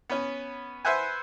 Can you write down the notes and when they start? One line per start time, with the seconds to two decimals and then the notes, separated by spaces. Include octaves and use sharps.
0.10 B3 C#4
0.85 B4 C5 E5 F#5 G#5